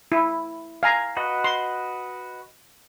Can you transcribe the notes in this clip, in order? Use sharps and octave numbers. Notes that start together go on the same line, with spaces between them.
E4
F5 G#5 A#5
F#4 B4 D#5
C6